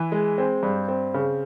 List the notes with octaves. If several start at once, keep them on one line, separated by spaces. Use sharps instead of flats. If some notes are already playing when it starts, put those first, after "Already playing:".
Already playing: E3
G#3
C4
G2
C4
C#3